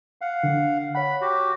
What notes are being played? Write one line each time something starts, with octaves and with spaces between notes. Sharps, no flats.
F5 F#5
D3
C#5 F#5 B5
F#4 G4